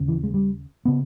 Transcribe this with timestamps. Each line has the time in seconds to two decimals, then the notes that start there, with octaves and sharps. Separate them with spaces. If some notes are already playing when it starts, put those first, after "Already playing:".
Already playing: D#2 C#3
0.08 E3
0.23 G#3
0.34 G3
0.85 C#3 B3